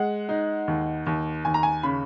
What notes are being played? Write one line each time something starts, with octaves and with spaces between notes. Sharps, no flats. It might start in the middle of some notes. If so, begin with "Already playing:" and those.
Already playing: G#3 F#5
D#4
D#2
D#2
D#2 G#5
A#5
G#5
C#3 B5